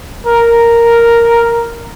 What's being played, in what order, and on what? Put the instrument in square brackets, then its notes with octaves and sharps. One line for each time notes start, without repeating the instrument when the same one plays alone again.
[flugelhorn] A#4